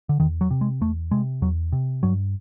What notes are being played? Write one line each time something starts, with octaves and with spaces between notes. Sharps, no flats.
D3
E2 D#3
F#3
C3
G#3
E2 A3
C3 G#3
E2 F#3
C3
G2 F#3